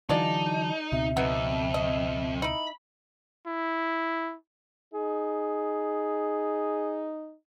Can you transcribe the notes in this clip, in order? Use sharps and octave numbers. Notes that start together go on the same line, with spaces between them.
D3 E3 F#3 G#3 D#4 F4 D5 A5
C#2 B2 C4 E5
F2 F#3 B3 D#4
D#5
D#4 E4 B5
E4
D#4 G#4